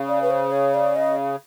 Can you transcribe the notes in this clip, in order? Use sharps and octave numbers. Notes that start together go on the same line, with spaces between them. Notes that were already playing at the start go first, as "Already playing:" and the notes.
Already playing: C#3
D5
B4
C5
C#5
D5
D#5